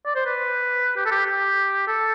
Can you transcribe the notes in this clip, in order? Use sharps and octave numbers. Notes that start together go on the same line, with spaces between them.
D5
C5
B4
G4
A4
G4
G4
A4